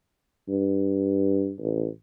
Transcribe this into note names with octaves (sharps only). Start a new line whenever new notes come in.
G2
A1